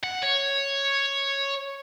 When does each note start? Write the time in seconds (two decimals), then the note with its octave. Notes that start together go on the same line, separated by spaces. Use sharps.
0.03 F#5
0.23 C#5